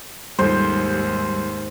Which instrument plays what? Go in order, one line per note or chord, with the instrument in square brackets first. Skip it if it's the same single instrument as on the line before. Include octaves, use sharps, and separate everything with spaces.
[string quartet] D#2 G#2 [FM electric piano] G3 [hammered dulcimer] C5